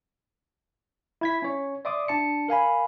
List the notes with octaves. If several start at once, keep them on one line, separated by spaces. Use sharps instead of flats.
E4 G#6 B6
C#4 C#5
D5 E5 C6 D6 D#6
D4 A5 C#7
A#4 F5 G#5 B5